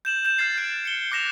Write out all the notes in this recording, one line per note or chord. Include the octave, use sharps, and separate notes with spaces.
G6 E7 F#7
G6 E7
F6 G#6 A6 C7
F#6 A6 D7
C#7 G7
D6 F#6 A#6 E7 F7